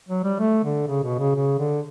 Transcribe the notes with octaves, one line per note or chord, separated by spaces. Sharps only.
F#3
G3
A3
D3
C#3
B2
C#3
C#3
D3